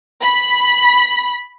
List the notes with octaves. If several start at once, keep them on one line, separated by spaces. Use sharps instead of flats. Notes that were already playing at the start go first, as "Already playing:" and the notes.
B5